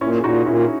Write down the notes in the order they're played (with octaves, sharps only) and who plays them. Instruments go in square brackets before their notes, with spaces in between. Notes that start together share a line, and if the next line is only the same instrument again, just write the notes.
[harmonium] A#2 [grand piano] C#4 E4
[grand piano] G#4
[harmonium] A#2 [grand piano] D#4 F#4
[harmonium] A#2 [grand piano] C#4 E4